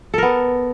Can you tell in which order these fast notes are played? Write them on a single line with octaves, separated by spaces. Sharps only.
A4 A#4 B3